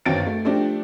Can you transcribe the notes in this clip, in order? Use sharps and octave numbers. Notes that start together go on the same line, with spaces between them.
G1 D#2 C4 C#4 A6 D7
A3
F3 A3 C4 D4 G4